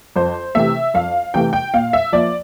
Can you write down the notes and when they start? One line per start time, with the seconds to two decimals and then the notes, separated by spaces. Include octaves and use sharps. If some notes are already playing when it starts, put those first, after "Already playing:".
0.16 F2 C5
0.55 C3 E3 A3 E5
0.94 F2 F5
1.34 C3 E3 A3 G5
1.53 G5
1.74 A#2 F5
1.93 E5
2.12 F3 A#3 D5